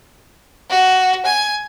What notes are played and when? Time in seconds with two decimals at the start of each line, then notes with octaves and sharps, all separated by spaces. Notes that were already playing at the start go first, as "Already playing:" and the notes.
0.70 F#4
1.26 G#5